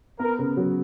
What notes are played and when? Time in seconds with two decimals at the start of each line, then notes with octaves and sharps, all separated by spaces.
0.19 B3 A#4
0.39 C#3
0.57 F#3